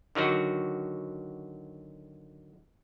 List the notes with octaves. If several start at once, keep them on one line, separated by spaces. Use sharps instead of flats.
D3 D#3 F#3 F#4